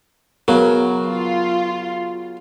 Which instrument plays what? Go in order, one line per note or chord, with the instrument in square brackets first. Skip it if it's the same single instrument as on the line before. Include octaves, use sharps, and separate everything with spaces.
[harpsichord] C#3 F#3 [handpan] B3 A#4
[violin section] F4